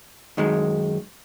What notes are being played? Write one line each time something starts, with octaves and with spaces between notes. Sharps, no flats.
F#2 D#3 G#3